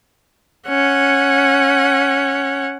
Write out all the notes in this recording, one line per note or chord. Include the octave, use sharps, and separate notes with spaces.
C#4 F#5